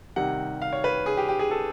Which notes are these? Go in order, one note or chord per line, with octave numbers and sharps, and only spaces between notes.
C3 D#3 G3 F#5
F5
C#5
B4
G#4
G4
G4
G#4
A4